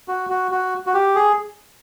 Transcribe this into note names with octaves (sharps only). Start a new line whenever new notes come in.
F#4
F#4
F#4
F#4
G4
G#4